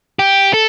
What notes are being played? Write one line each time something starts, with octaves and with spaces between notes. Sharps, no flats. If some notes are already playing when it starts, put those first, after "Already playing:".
G4
A4